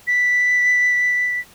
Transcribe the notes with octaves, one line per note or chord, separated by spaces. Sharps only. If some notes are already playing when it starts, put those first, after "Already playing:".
B6